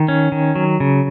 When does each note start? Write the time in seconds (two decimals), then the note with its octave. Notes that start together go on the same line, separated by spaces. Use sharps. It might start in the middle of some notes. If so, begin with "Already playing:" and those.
Already playing: D#3
0.08 C#4
0.32 D#3
0.55 F#3
0.80 C#3